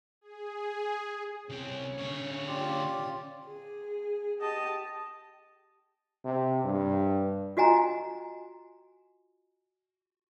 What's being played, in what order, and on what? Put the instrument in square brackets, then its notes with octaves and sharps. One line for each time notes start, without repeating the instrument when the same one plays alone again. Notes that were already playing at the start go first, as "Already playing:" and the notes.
[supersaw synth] G#4
[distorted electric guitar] C2 C4 [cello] C#4
[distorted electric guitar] D3 C#5
[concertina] F4 G4 D5
[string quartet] G#4
[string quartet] G4 A5 [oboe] D#5
[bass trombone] C3
G2
[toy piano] F4 F#4 D#5 G#5 A#5